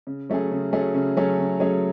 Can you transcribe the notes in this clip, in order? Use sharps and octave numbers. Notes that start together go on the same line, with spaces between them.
C#3
F#3 A3 C#4 G#4
C#3
F#3 A3 C#4 G#4
C#3
F#3 A3 C#4 G#4
C#3
F#3 A3 C#4 G#4